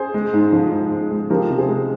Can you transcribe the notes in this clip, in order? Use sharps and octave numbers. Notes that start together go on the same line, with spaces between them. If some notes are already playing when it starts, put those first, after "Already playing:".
Already playing: G#4 C5
G#3
G#2
F3
G#2
G#3
G#3
F3 G4 A#4
C3
G#4 C5
G#3